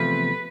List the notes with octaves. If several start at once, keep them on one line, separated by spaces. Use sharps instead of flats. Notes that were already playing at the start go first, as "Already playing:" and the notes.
Already playing: E2 C3 F3 A3 B4